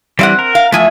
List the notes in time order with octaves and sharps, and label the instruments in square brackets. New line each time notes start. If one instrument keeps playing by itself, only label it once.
[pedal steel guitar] E3 G3 [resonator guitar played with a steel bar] C4 E5 F#5
[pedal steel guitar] A#4
[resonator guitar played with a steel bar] F5
[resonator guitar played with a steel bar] E2 F3 E5 [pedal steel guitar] A3 G#5